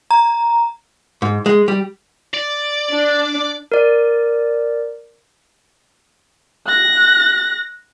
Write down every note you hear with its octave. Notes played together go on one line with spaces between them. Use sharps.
A#5
G#2
G#3
G3
D5
D4
A#4 D5
F#6 A#6